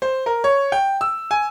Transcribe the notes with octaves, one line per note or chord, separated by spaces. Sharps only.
C5
A#4
C#5
G5
E6
G#5